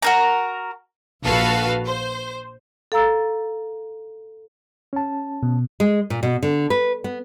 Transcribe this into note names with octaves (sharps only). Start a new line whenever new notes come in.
F#4 A#4 A#5
A#1 F#4 A4 B4 F5 A5
C5
A4 F5 A#5 E6 A6
C#4 A5
B2
G#3
A#2
B2
D3
B4
B3